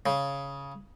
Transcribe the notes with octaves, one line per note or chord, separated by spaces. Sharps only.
C#3